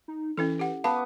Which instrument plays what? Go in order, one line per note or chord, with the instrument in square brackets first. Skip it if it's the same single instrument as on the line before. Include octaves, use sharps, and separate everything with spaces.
[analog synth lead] D#4
[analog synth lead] E3 [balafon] C#4 E4 A4
[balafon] G4 F#5
[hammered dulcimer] B3 [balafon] F5 A5 [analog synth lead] D6